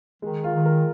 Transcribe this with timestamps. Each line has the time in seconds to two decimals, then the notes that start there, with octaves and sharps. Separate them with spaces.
0.22 D#3 G#3
0.44 F4
0.55 D#3
0.65 A#4